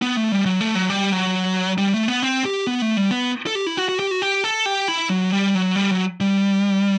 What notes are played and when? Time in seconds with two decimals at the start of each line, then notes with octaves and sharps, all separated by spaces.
0.02 B3
0.17 A3
0.32 G3
0.45 F#3
0.61 A3
0.75 F#3
0.90 G3
1.12 F#3
1.78 G3
1.94 A3
2.08 B3
2.22 C4
2.45 G4
2.67 B3
2.82 A3
2.97 G3
3.11 B3
3.47 A4
3.55 G4
3.66 E4
3.77 F#4
3.89 F#4
3.99 G4
4.11 F#4
4.22 G4
4.44 A4
4.66 G4
4.88 E4
5.10 F#3
5.32 G3
5.55 F#3
5.76 G3
5.91 F#3
6.21 G3